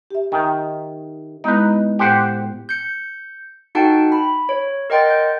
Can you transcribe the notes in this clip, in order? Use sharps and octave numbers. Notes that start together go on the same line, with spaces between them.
G4 E5
D#3
G#3 B3 D#4 E4 B4
A2 G4 C5 F#5
G6 C#7
D#4 F#4 A4 F#5 G5 A5
B5
C#5
A#4 D#5 F#5 G5 C6 A6
G6